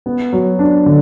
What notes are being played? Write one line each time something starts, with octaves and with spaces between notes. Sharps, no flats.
B3
F#3
D4
D3